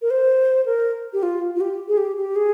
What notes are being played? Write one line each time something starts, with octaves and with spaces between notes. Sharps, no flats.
A#4
C5
A#4
G4
F4
F4
G4
G#4
G4
G4
G#4